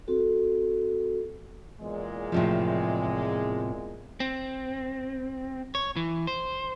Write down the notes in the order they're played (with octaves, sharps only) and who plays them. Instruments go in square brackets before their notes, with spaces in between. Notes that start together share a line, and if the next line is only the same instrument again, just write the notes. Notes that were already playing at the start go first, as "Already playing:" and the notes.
[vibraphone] C4 F#4 A4
[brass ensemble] E2 A#2 G#3
[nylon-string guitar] A2 C3 F3
[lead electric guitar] C4
C#5
E3
C5